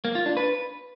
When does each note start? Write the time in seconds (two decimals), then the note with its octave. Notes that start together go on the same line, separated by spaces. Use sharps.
0.05 A#3
0.15 F4
0.26 D4
0.37 B4